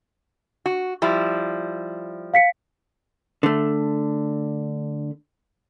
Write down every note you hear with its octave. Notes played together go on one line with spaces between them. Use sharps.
F#4
F3 G3 E4
F5 B6 C#7
D3 A3